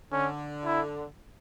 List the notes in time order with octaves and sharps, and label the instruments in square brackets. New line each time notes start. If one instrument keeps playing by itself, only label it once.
[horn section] D3 [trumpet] C#4
[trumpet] E4